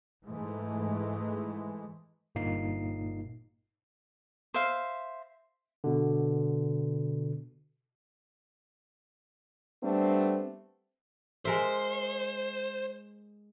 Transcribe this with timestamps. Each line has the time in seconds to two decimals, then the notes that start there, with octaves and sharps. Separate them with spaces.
0.24 G#2 E3 G#3 A3
2.35 G1 G2 A#2 A#3 D#4 C7
4.54 C5 E5 F5
5.84 B2 D3
9.81 G3 A3 B3 C4 D4
11.45 G#3 A#4 C5 E5